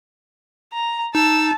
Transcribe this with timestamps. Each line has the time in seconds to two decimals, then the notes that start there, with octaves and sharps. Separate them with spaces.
0.73 A#5
1.15 D#4 A5 E6